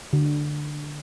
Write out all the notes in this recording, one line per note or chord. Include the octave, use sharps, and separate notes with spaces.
D3